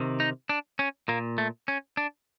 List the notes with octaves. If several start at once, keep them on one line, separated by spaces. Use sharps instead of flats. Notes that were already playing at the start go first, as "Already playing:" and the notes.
Already playing: C3 D#3
D#4
D4
C#4
A#2 A#3
A3
C#4
D4